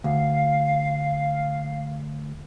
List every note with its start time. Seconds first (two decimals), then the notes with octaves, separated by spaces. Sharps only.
0.04 D2 F5